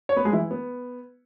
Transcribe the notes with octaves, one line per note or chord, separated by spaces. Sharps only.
C#5
B3 B4
G#3 G#4
E3 E4
B3